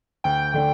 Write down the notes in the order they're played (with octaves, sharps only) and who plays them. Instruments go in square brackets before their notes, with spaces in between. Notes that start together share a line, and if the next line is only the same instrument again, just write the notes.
[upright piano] D2 [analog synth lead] G5
[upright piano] D3 A3 D4